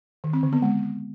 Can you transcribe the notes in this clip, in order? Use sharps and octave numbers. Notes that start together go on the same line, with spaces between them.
D#3
C4
D3
B3
G#3